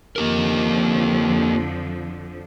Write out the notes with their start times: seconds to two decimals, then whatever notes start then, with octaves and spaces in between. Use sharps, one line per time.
0.16 F2 D3 F3 A#3 G4 A#4